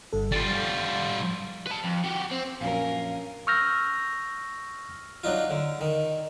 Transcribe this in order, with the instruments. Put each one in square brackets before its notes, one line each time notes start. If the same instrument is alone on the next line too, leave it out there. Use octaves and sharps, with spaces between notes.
[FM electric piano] G1 G2 A4
[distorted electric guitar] G3 F4 [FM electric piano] A6
[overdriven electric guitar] B4 A5
F2
F#4 G4
C4
[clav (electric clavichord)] A#1 F#2 [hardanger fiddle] C#4 A#4 [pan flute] F5
[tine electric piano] C#6 E6 F6 G6 A#6
[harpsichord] F#3 D4 D#4 F4
D3
D#3